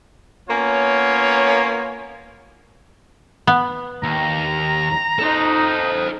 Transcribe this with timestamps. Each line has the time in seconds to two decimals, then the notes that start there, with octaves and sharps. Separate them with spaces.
0.50 A#3 B3 C#4 F4 C#5
3.47 B3
4.03 D#2 A#5
5.19 D#4 A4 C5